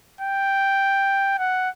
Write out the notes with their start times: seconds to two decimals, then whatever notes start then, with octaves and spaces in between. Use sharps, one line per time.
0.21 G5
1.38 F#5